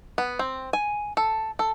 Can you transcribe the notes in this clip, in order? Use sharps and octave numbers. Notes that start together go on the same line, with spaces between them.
B3
C4
G#5
A4
A4